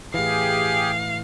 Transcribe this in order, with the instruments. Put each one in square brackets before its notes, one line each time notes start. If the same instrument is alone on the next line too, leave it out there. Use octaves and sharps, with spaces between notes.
[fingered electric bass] A2 E3 [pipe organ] G4 G#4 [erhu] F5